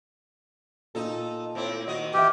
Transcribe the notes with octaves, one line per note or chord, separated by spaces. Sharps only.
A#2 D#4 A4
A2 C4 E4
D#3 F#4 D#5
E3 G4 E5 F6